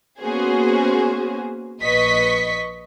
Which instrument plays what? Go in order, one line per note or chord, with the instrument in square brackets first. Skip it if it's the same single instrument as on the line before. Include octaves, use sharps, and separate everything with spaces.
[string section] A#3 B3 C#4 F#4 G#4 C5
A#1 B4 D#5 C#6 B6